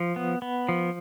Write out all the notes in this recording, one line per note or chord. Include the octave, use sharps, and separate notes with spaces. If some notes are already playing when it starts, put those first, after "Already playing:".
Already playing: F3
B3
B3
F3